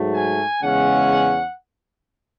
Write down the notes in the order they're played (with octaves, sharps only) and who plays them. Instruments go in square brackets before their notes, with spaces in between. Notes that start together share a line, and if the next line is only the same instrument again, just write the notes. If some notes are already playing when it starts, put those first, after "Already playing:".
Already playing: [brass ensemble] G#2 F#3 A3
G#5
E2 C#3 G#3 C#4 F#5